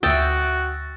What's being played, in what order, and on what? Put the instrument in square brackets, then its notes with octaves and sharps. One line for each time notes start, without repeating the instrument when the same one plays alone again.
[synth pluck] D2 E5 [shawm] F#4 [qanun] G5 [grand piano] D#6 E6 A6